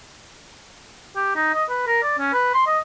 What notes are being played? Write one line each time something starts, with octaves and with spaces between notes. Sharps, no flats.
G4
D#4
D#5
B4
A#4
D5
C#4
B4
C6
D#5